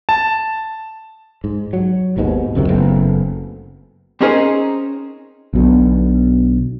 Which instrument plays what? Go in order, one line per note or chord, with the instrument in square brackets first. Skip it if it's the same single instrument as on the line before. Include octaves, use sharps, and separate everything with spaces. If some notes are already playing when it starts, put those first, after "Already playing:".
[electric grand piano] A5
[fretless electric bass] G#2
F#3
G#1 D#2 G#2 B2
C#2 F#2 C3 D#3
F#1 A3 B3 C4
[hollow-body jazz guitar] C4 C#4 D#4 G#4 A#4 C5
[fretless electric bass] B1 B2 D3